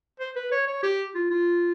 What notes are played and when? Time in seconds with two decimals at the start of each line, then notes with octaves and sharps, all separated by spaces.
0.20 C5
0.35 B4
0.51 C#5
0.67 C#5
0.83 G4
1.15 F4
1.30 F4